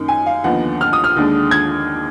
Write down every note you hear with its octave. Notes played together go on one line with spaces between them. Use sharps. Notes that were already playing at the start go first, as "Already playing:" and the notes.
Already playing: F#2 D#3 A#3 D#4
G#5
F5
D#2 D3 F3 B3 D#4 F#5
F6
D#6
F6
D#2 D3 G#3 D4
G#6